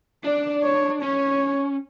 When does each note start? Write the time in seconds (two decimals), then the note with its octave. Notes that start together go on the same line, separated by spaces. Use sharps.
0.24 D4 D5
0.64 C#5
1.02 C#4 C#5